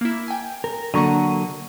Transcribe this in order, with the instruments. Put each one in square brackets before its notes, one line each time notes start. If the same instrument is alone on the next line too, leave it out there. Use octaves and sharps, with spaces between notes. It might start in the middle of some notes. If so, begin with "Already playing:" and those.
[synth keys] A#3 E4
G5 G#5
[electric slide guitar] A#4
[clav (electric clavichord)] D3 A#5 [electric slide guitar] F#3 A#3 [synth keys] F#5 C#6 D#7